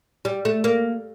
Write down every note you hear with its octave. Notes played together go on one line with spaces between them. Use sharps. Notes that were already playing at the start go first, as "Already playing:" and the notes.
G3
A3
A#3